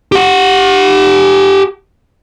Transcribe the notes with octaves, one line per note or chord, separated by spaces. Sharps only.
G4 F#5